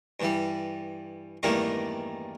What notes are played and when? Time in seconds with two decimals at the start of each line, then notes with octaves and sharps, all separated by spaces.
0.20 G2 E3 G3
1.43 E2 G2 D#3 G3 A3 A#3